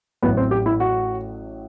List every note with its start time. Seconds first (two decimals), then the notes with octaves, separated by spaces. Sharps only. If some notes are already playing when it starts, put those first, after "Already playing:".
0.22 A1 A2 F#3 B3
0.37 C4
0.51 G4
0.66 E4
0.80 F#4